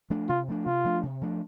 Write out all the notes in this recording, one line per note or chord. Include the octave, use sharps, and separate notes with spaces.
F3 A3 D4
C3 F4
F3 A3 D4
C3 F4
F3 A3 D4
C3
F3 A3 D4